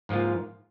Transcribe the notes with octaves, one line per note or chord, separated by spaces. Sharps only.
G#2 F3 A#3 F4